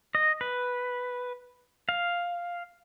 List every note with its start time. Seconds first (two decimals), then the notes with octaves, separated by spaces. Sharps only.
0.15 D#5
0.41 B4
1.89 F5